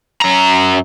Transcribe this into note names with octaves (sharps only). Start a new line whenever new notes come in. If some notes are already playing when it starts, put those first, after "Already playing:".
F#2 A#5